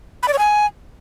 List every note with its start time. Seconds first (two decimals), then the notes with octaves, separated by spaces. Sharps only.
0.23 B5
0.28 D5
0.33 C#5
0.39 G#5